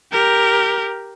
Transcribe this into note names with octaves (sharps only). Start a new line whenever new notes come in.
G4 A#4